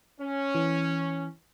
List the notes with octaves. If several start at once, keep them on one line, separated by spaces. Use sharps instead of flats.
C#4
E3